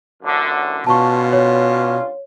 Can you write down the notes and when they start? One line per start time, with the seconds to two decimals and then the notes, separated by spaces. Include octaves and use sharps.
0.23 A1 F#2 D3
0.87 G2 B2 C#4 F4 A5 C#6
1.33 C#5